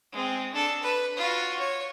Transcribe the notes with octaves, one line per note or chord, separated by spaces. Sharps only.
G#3 C4
D4 A4
B4
F4 F#4
C#5